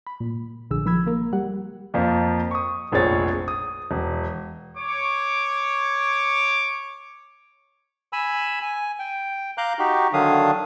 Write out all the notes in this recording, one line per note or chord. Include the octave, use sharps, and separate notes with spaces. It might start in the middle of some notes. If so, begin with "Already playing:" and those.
B5
A#2
A#1 D3 G#4 E6
D#3 F3 B5 E6 G#6
A#3 A#4
G3 G4 F#5
F2 F3 A#3
C#6 D#6
F1 A#1 C4 G#4 C#5 A6
D#6
E1
C#5 D6
G#5 B5 E6
G#5
G5
F5 A#5 D6 F#6 G6
D#4 F#4 G4
D3 D#3 F#3 D4 F5 D#6